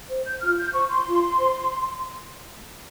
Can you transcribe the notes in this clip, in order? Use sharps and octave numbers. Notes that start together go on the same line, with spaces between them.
C5
G6
F4 F6
G6
C5 C#6
C6
F4
C5